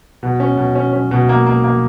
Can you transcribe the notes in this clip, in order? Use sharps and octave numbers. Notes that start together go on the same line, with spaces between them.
B2
C#4
B2
C#4
C#4
B2
A#3
A#3
A#3